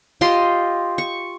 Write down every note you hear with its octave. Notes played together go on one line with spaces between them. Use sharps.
F4 G4 D#5 C6
C#6